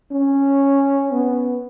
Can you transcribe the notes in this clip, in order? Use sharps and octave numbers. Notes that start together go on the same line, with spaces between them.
C#4
B3